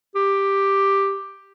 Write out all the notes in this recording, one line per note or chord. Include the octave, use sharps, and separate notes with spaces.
G4